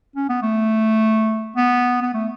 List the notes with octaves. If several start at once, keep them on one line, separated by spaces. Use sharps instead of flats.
C#4
B3
A3
B3
B3
A3